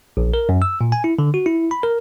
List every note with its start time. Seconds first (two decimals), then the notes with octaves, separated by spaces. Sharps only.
0.17 A#1
0.34 A#4
0.49 F#2
0.62 E6
0.81 A#2
0.92 G#5
1.04 E4
1.19 D3
1.34 F#4
1.46 E4
1.71 B5
1.83 A#4